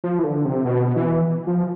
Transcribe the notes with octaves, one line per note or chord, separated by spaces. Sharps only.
F3
E3
D3
C3
B2
E3
F3